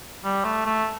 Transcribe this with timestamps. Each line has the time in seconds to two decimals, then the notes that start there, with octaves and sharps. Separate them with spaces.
0.24 G3
0.45 A3
0.66 A3